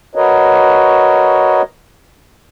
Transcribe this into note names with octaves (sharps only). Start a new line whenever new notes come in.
F#4 A#4 B4 C#5 D#5